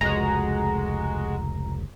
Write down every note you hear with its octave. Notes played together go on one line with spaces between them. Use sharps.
F1 C#2 G#3 F#4 A#5